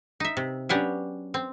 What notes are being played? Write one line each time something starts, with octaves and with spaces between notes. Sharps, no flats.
D#4 E5
C3
F#3 B3 C#4 D4 G4
C4